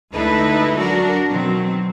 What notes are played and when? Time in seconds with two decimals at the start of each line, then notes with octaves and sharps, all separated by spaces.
0.13 D2 G#3 D#4 E4 A4 B4
0.79 F#3 D4 F#4 A#4
1.30 B2 D#3 F#3 C4